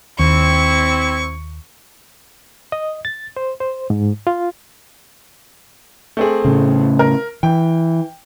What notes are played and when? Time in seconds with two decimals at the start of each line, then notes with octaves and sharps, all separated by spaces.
0.19 D#2 C4 E4 C#6
2.72 D#5
3.05 A6
3.37 C5
3.60 C5
3.90 G#2
4.27 F4
6.17 A3 C4 G#4
6.45 A2 C#3
6.99 A#4
7.43 E3 G5